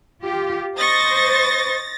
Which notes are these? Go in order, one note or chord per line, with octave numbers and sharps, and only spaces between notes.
F4 G4
C5 D#5 C#6 A6 A#6